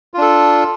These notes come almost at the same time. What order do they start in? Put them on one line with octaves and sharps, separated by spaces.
F4 D4 A4